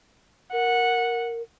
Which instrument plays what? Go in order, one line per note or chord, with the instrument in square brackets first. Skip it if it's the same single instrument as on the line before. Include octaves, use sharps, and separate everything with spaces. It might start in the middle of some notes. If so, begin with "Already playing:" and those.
[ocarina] A#4 [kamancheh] F#5